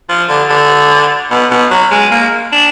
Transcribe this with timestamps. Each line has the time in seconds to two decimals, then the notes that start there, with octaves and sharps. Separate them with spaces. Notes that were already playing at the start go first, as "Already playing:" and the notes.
0.09 F3
0.29 D3
0.49 D3
1.31 B2
1.51 B2
1.71 F#3
1.91 G#3
2.11 A#3
2.52 D4